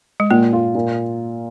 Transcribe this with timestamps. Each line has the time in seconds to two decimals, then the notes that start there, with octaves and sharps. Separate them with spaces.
0.20 G#3
0.31 A#2 A#3
0.53 F4
0.75 A#2